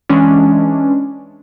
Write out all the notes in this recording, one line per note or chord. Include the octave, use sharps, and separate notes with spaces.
E3 G#3 C#4 D4